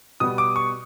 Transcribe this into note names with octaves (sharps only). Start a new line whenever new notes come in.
B2 G3 B3 D#6
D6
C#6